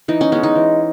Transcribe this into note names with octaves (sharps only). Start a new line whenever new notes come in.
E3 D#4
C#4
G#3 B3 C#4
D#4
E3